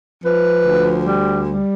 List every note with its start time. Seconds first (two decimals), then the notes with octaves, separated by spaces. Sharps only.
0.23 F3 B4
0.65 D2
1.06 G3
1.47 G3